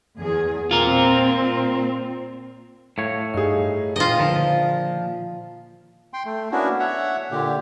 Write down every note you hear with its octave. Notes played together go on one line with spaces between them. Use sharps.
E2 G#4
A#2 C4 F4 A#4
A2 C#5 F5
G2 D#4 G#4 F5
A#2 F4 B4 D#5 G5
A#2 D3 D#3 F3
G5 C6
A3
A#3 B3 C#4 D4 E4 F#4
C#5 E5 F#5
A#2 D3 G4